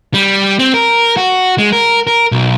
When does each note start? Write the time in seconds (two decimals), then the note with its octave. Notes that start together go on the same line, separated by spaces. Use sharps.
0.14 G3
0.59 C4
0.74 A#4
1.17 F#4
1.58 G#3
1.72 A#4
2.07 A#4
2.32 B1